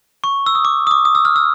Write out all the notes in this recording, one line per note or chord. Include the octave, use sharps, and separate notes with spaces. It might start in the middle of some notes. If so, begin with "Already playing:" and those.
C#6
E6
D#6
D6
D#6
D6
D#6
E6
F6
E6